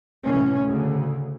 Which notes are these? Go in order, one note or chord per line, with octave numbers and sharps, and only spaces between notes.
C2 A2 E3 C#4
D2 C#3